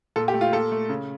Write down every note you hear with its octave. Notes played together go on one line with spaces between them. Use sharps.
A#2 A4
G4
A3
F4
A#2 A4
A3
C#3